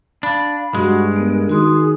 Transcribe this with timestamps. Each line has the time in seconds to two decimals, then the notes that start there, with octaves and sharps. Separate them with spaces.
0.23 D4 F5 B5
0.75 G2 G#3 F#4
1.16 B3 A#4
1.49 D#3 F#4 G#4 C6 D#6